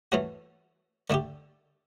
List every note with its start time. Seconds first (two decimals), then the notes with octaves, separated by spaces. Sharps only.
0.12 E3 A3 C#4 F#4
1.10 D3 A3 D4 G4